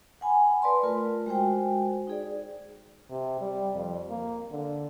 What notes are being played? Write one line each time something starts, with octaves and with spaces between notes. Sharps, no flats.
F#5 G#5 B5
B4 D5 A5 C6
A3 F4 A#4
G#3 F#4 C5 G5
D#4 G#4 D5
C3
G3
F2
A#3
D3